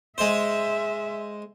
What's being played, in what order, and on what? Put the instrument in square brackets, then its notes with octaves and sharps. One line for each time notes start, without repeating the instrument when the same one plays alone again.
[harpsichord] G#3 C5 [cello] E5